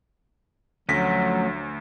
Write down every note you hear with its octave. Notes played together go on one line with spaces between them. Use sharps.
D2 F3 F#3 A3 C#4 A#6 B6